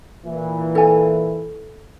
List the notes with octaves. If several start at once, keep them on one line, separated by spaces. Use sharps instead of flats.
A#2 E3
A4 G#5